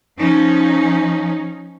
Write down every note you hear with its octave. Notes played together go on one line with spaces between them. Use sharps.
F3 C#4 D#4